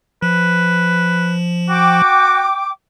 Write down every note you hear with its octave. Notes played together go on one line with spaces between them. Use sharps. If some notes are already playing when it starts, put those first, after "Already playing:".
F3 B4
F#4 G5 D6